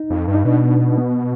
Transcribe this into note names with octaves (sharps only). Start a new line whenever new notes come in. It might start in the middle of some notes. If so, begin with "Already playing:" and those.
Already playing: D#4
F2
G2
D#4
B2 D4
B3